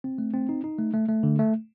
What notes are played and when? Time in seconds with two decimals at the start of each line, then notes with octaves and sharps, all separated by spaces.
0.04 C4
0.18 A3
0.33 C4
0.49 D#4
0.64 D#4
0.78 A3
0.94 A3
1.08 A3
1.23 D3
1.39 A3